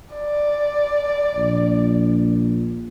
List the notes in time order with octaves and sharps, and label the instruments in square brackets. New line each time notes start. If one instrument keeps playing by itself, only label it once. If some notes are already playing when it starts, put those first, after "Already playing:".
[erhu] D5
[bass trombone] A#1